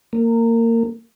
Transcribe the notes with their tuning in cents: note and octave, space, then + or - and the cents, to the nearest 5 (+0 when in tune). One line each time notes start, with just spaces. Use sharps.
A#3 -25